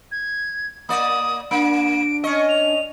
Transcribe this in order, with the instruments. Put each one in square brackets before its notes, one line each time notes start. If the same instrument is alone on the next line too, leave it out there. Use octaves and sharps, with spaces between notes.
[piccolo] G#6
[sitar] A#3 D5 [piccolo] D#6
[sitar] A#3 [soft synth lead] D4 [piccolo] D7
[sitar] C#4 D#5 [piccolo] C#6
[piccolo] F7